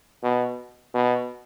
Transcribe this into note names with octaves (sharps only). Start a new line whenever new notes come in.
B2
B2